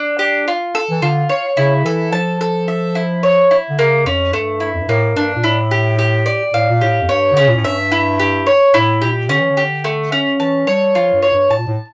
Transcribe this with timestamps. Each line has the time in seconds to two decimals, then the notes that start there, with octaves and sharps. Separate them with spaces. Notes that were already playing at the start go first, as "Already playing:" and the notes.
Already playing: D4
0.19 G4
0.48 F4
0.75 A4
0.90 E3
1.02 D3 F4
1.29 C#5
1.57 C#3 E4
1.84 E3 A4
2.12 F3 A5
2.41 A4
2.68 E5
2.95 E4
3.23 C#5
3.51 E4
3.70 D3
3.79 C#3 A#3
4.06 F2 C#4
4.33 G2 A3
4.60 E4
4.74 F2
4.81 G2
4.88 A2 A#3
5.16 G2 D4
5.36 A#2
5.44 A2 E4
5.71 G4
5.99 G4
6.26 D5
6.54 A2 F5
6.69 A#2
6.81 A2 G4
7.02 F2
7.09 G2 C#5
7.32 D3
7.37 C#3 C#4
7.48 A#2
7.56 A2
7.64 G2 E5
7.92 E4
8.20 G4
8.47 C#5
8.74 A2 E4
9.02 A#2 G4
9.29 D3 C#4
9.40 E3
9.50 D3
9.57 G4
9.84 A3
10.12 C#4
10.40 E3 A5
10.67 G3 C#5
10.95 F3 F4
11.13 G2
11.22 C#5
11.33 G2
11.50 A2 A5
11.58 A#2
11.67 A2